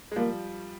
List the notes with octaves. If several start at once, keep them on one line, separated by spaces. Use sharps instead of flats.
G#3
F3 G3 A#3